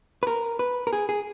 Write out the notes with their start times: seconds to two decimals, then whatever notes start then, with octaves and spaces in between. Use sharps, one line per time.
0.23 B4
0.27 A#4
0.59 B4
0.87 A#4
0.93 G#4
1.09 G#4